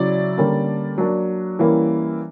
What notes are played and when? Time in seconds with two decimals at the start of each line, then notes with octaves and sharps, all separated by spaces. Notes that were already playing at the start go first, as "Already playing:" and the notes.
Already playing: C#3 F#3 C#4 E4 D5
0.37 D3 G3 A#3 C#4
0.98 F#3 A#3 D4
1.59 E3 G3 A#3 C#4 E4